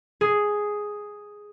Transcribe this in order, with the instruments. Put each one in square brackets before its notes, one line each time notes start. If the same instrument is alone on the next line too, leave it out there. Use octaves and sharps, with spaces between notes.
[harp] G#4